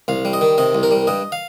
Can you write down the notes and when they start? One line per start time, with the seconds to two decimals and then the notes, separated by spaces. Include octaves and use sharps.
0.08 C2 F5
0.25 G3
0.33 D#5
0.41 D#3
0.58 C3 D#5
0.75 C2
0.83 A#4
0.91 G3
1.07 G2 D#5
1.32 F5